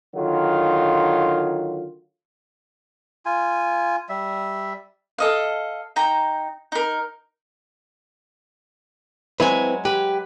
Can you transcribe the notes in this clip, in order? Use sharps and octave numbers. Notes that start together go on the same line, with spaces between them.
D3 D#3 F#3 F4
F4 G#5
G3 E5
A4 D#5 F5
D#4 G5 A#5
D#4 A#4
F#3 G#3 C4 E4 B4 G#5
G4 B4